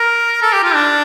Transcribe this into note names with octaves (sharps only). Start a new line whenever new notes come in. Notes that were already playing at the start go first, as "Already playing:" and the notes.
Already playing: A#4
A4
G4
F4
D4